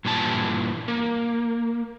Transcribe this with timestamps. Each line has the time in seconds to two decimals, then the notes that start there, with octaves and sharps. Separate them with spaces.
0.05 G2 A#2 E3 A5
0.88 A#3